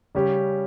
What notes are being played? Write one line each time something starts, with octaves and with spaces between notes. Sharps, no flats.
C#3 G3 C#4 G4